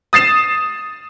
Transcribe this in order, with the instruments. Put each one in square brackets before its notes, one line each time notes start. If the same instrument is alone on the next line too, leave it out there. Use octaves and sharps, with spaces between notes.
[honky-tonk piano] D#6 A6 C7 E7